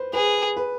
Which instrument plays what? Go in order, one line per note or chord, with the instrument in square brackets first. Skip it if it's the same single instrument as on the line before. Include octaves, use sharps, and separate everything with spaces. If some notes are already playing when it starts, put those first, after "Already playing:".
Already playing: [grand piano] B4 C5
[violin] G#4 [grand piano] B4
[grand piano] B4